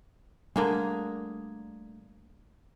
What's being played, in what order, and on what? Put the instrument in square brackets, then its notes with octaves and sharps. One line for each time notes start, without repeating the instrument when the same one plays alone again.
[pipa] D3 A#3 G#4 [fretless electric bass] G3 A3 D4